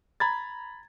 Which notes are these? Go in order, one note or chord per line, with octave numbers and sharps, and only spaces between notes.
A#5 B5 G#6 A6